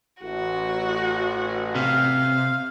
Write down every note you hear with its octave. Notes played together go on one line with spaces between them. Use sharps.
A1 F#4
C3 F5